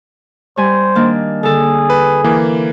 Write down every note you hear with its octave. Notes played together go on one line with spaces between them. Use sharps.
G3 C5 G#5
D#3 A#3 D4
D3 G#4 A4
B4
E3 A#3